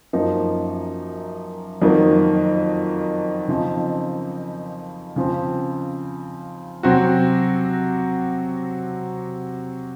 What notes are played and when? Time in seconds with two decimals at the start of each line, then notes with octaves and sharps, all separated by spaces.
0.13 F#2 F3 A#3 D#4
1.82 F2 D#3 F#3 A#3
3.48 C#3 F3 C4 D#4
5.16 C#3 F3 C4
6.83 C3 F#3 C4 F#4